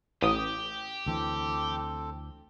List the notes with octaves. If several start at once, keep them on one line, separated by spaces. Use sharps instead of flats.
A1 G4 D#6
D2 E3 C4 A4